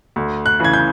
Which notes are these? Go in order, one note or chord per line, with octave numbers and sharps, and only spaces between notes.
D2
F#6
C#3 E3 G#6
G6